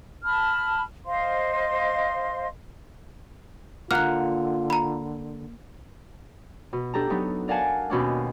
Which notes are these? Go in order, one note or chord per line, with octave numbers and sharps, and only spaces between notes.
A5 B5 F6
C5 D#5 F5 C6
D3 A#3 F4 F#5 F6 F#6
A#5 B5
B2
D4 G4 A4 A#5
F#3 B3 D4 D#4
A#4 D5 F5 F#5 G#5 A5
D#2 B2 C#4 D4